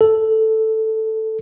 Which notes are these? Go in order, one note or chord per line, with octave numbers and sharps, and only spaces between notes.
A4